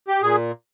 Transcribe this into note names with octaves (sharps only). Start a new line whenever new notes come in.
G4
A#2 G#4